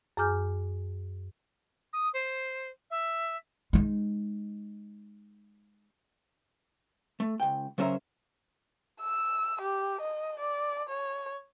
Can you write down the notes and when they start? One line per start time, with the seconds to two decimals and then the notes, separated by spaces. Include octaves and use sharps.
0.17 F#2 G#4 G#5 D6 F6 G6
1.93 D#6
2.13 C5
2.90 E5
3.73 G#3 D#4
7.20 A3
7.40 C#2 G5
7.78 C#3 F#3 C#4 A#4 C5 E5
9.02 E6
9.61 G4
10.00 D#5
10.39 D5
10.89 C#5